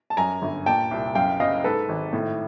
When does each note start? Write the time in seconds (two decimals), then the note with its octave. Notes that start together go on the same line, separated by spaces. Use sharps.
0.10 A5
0.17 F#2 G#5 A#5
0.42 G1
0.66 A#2 G5 A5
0.91 C2
1.15 F#2 F5 G5
1.40 F#1 D#5 F5
1.64 G#2 A4 B4
1.89 G#1
2.13 A2